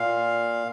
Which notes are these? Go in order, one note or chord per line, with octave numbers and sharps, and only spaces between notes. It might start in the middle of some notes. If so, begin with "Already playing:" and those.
Already playing: A#2 F5